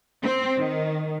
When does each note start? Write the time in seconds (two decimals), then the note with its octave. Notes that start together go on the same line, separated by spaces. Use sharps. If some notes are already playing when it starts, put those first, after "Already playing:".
0.23 C4
0.58 D#3